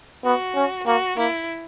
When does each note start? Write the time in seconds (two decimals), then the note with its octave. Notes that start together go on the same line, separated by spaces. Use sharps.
0.24 B3 F#4
0.55 C#4
0.86 A#3 F#4
1.17 A#3 E4